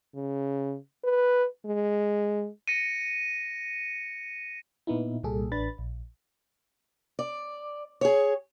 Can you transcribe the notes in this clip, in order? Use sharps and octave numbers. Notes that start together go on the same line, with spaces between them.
C#3
B4
G#3
A#6 C#7 D#7
A#2 B3 D#4 E4
C2 A#2 G3 G#4 A4
A1 D4 B4 B5 A6
A#1
D5
G#4 C#5